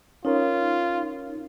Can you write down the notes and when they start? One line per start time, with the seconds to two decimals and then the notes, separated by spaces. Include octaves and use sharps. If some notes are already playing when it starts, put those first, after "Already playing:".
0.25 C#4 D#4 F4 A#4 C#5